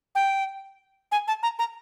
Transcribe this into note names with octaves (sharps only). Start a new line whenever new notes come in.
G5
G#5
A5
A#5
A#5